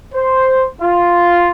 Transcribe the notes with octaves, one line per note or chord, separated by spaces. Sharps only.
C5
F4